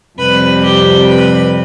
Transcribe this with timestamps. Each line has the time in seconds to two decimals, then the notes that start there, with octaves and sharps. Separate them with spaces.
0.18 F2 C3 G3 B4
0.63 G4
1.07 B4